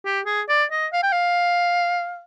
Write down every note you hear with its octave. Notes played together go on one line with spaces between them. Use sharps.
G4
G#4
D5
D#5
F5
G5
F5